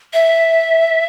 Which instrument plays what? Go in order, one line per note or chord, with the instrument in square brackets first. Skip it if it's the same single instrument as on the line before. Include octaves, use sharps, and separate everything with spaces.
[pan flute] E5